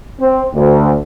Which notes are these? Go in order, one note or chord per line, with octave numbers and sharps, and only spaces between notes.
C4
D2